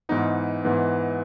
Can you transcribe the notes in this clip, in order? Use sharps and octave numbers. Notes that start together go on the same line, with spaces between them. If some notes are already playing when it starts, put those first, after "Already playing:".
G#2 E3 B3 D#4
G#2 E3 B3